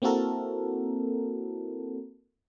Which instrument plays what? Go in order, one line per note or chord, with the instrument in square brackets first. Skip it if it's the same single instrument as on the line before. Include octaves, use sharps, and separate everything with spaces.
[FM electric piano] A#3 C4 E4 F#4 A4 A#4